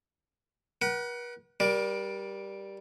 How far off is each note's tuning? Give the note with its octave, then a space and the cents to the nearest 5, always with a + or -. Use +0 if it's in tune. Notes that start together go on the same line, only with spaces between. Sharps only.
B4 -45 F#5 +25
G3 +0 A#4 +30 D5 +0